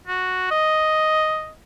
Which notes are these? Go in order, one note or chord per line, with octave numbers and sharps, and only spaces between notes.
F#4
D#5